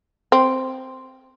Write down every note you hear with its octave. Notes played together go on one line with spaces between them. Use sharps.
C4